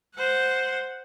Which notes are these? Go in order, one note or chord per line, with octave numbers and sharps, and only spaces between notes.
C5 F#5